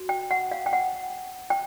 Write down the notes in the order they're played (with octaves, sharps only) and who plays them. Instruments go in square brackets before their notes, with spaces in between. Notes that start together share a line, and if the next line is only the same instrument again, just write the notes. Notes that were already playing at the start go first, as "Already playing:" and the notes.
Already playing: [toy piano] F#4
G5
F#5
F5
G5
F#5
G5